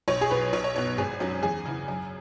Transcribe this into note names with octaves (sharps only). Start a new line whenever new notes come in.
B1 C#5
G#4
B2 B3 B4
B1 C#5
C#5
B2 B3 C#5
G#1 G#4
F#2 F#3 C#4
E2 G#4
C#3 E3
F#2